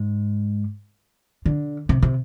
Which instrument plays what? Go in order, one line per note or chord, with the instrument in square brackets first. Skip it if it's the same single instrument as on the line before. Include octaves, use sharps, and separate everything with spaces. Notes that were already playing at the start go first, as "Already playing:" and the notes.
Already playing: [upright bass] G#2
D3
C3
C3